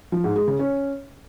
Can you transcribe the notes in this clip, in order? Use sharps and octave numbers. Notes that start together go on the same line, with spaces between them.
F3
G#2
G#3
C#3
C#4